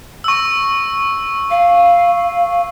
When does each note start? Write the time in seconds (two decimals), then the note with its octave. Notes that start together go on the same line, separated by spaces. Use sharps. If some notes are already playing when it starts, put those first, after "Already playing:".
0.24 C#6 E6
1.50 F5